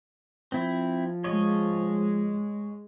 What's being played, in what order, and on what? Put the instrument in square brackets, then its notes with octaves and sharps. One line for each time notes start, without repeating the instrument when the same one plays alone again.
[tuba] F3 [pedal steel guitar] C4 E4
[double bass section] G#3 [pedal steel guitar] C#5 D#5